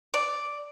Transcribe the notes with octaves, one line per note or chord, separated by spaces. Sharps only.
D5